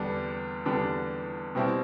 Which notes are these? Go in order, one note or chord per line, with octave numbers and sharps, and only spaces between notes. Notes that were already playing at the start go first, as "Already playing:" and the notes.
Already playing: E2 D3 G3 B3 D4
E2 D3 G3 B3 D4
B2 G3 C4 E4